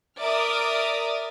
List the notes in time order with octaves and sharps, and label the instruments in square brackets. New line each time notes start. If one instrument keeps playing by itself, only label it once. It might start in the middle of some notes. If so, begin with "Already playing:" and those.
[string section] A#4 D5 E5 D6 D#6 F6